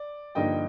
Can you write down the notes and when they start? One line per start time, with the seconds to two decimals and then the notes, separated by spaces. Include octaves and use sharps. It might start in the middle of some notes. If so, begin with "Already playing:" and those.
Already playing: D5
0.35 G2 D3 F3 A#3 D#4 D#5 G5